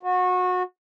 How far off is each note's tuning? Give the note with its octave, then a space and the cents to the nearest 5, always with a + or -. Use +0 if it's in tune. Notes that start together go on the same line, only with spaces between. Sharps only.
F#4 -25